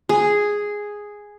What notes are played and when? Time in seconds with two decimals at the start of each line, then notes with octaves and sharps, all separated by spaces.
0.09 G#4